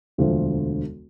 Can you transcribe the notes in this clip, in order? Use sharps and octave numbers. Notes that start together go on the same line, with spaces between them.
E1 D2 D3 F3